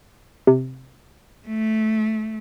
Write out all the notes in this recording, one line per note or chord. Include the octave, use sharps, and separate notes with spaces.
C3
A3